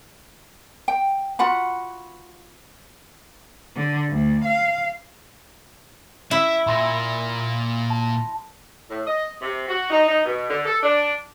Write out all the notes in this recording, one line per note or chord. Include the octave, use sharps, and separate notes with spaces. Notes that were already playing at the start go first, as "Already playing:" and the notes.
G5
F4 F#4 F#5 B5
D3
D2
F5
E4 E5
A#2 B5 C6 A#6
A5
A2
D#5
C3
F#4
D#4
D#4
B2
D3
A4
D4